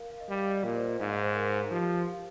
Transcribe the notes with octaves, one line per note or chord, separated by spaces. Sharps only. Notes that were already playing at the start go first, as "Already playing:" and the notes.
Already playing: A#4 F5
F5
D#5
G3 F5
F5
D#5
D5
A#2 A#4
C5
D#5
G#2 F5
D#5
C5
A#4
F3 G4
F5